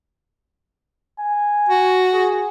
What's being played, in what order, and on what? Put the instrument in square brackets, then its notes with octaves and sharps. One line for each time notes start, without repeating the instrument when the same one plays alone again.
[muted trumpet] G#5
[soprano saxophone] F#4
[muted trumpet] G#4